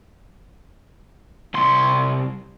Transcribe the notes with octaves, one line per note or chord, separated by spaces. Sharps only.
C2 C6